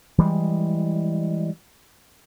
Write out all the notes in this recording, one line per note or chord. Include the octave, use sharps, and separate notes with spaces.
E3 G3 G#3